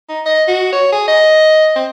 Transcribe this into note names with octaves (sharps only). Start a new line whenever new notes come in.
D#4
D#5
F#4
C#5
G#4
D#5
C4